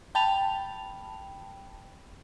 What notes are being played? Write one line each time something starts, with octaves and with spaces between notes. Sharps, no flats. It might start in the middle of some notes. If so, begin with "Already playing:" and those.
G5 A5 B5 F7